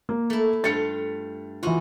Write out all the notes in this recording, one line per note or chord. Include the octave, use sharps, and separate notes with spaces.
A#3
A3 E4
G2 A3 F4 A6 C#7
E3 D#4 F4 F#4